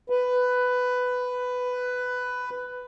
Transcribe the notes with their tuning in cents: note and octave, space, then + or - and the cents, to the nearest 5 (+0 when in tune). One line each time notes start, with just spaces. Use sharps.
B4 +10